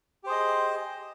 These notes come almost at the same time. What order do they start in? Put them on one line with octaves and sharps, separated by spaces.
G4 C5 G#4 D#5